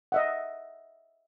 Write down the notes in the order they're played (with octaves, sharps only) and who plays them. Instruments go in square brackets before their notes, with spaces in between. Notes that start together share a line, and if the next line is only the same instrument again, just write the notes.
[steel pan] D#5 E5 F#5